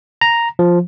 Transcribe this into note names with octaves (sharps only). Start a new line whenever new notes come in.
A#5
F3